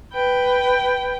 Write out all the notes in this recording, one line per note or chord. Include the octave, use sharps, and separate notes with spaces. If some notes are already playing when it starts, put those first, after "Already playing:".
B4 G5